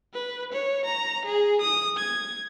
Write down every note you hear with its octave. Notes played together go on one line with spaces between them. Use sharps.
B4
C#5
A#5
G#4
D#6
G#6